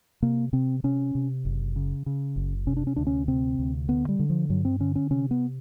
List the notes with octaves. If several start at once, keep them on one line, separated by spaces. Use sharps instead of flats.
C3 A#3
C3 C4
C3 C#4
C3
F#1
C#3
C#3
F#1
C3 C#4
D4
C#4
D2 D4
C#4
C3 C4
D2
D3 B3
G3
D3
F3
G2 F#3
C4
D3 C#4
C#4
C3 C#4
B3